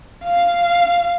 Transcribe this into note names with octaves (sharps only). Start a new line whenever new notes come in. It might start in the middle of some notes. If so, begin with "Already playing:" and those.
F5